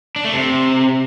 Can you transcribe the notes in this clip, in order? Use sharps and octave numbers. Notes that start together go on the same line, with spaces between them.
D4
A3
C3